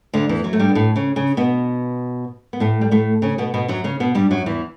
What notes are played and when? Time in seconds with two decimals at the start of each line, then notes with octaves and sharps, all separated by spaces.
0.14 D2 D3
0.29 E2 E3
0.44 F#2 F#3
0.53 A3
0.59 G2 G3
0.69 B3
0.75 A2 A3
0.96 C#3 C#4
1.16 C#3 C#4
1.37 B2 B3
2.53 B3
2.60 A2 A3
2.81 G3
2.91 A2 A3
3.22 C#3 C#4
3.38 B2 B3
3.54 B2 B3
3.68 F#2 F#3
3.84 C#3 C#4
4.00 B2 B3
4.15 G2 G3
4.31 F#2 F#3
4.46 E2 E3